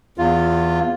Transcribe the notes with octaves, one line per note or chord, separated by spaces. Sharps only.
E2 F4